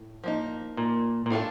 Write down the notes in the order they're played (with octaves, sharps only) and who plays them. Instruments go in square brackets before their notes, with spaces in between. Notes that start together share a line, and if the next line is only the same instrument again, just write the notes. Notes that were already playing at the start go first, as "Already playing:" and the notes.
Already playing: [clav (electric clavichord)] A2
[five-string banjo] F3 A#3 D#4
[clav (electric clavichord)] A#2
A#2
[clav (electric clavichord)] A2 [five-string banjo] D4 F4 A4